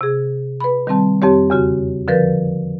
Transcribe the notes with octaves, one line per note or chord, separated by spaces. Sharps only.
C3 G#4
B4 B5
D#3 G3 C4 A5
F2 C4 G4 C#5
E2 C#3 F#4
D3 F3 A#4 B4 G6 A6